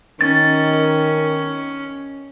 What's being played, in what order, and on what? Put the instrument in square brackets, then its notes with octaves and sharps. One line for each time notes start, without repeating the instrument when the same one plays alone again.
[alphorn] D#3 [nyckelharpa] C#4 [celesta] A6